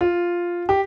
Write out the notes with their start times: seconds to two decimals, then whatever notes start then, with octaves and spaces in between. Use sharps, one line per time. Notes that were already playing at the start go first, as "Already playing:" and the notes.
0.01 F4
0.69 G4